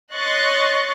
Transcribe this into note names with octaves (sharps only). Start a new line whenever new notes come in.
C#5 D#5 C6 C#6 F#6 A6